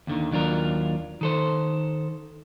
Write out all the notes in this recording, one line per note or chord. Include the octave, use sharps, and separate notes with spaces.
D#2 D3 D#3
D#2 F#3 D4 F4 A#4
D#3 A4 C5